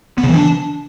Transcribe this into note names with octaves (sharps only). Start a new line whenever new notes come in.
B3
C#3
E3
D4